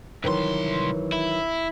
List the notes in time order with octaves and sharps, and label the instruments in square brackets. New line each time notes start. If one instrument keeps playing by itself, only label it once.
[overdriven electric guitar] C2 C6 [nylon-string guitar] D#3 E3 F#3
[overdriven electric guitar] E4